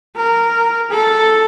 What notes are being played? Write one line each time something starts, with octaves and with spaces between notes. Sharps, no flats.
A#4
A4